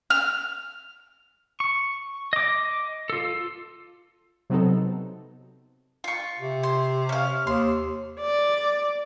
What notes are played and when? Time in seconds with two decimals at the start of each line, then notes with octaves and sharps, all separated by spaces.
0.10 F6
1.60 C#6
2.33 D#5 D6
3.10 F4 A4
4.50 C3 F#3 B3 C4 D#4 A4
6.04 F4 C#6
6.39 C3
6.63 C6
7.09 C#4 F5
7.47 D#2 C6
8.20 D5